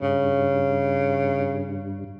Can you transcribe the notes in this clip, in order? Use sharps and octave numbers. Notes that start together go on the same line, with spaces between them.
G2 C#3